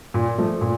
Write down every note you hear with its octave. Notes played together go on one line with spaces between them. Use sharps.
A#2
F3 A3
A#2